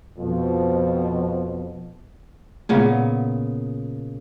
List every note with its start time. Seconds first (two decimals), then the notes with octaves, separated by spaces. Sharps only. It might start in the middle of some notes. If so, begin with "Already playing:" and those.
0.18 F2 B2 F3
2.69 A#2 C#3 B3